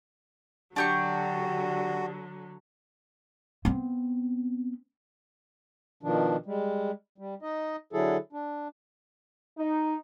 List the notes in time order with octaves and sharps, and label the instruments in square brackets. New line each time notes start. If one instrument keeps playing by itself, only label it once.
[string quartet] D3 F#3 [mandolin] D4 G4 C#6 [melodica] F#4
[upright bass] B3 C4
[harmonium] B2 D#3 F3 D4
G3 G#3
G3
D#4 D#5
D3 F#3 E4 G#4 A4
D4
[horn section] D#4